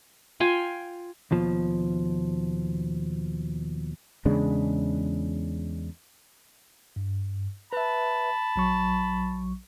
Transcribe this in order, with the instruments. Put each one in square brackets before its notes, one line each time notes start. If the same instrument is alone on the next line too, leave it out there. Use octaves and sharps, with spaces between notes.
[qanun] F4 F5 G5 G#5
[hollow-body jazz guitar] D#2 B2 F3
[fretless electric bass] E2 C#3 G#3 D4
[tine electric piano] G2
[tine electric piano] B4 E5 [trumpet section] A5 B5
[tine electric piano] A#1 F#3 C#6